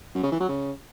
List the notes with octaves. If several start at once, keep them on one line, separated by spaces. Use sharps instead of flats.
F#2
C#3
E3
F#3
C#3